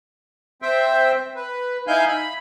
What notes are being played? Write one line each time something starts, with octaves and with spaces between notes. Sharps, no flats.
C4 C5 E5 G5
B4
D#4 E4 F5 G#5 G6
B5